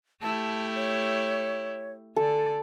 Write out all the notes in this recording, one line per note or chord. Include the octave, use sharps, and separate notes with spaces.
A3 E4 G4 A5
C#5
D3 A4 D5